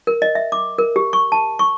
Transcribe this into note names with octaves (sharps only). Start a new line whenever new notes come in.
A#4
D#5
E5
D6
A#4
G4
C#6
A5
C#6